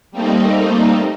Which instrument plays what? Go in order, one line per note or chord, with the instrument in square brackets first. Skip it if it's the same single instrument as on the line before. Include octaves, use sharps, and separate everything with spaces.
[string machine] G3 A3 A#3 C4 D#4